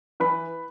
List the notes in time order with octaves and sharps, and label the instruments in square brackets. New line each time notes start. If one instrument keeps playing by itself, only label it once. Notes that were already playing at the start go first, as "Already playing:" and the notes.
[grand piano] E3 B4 B5